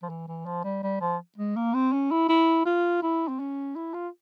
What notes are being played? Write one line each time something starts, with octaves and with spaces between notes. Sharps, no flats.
F3
E3
E3
F3
G3
G3
F3
G#3
A#3
C4
C#4
E4
E4
F4
E4
C4
C#4
E4
F4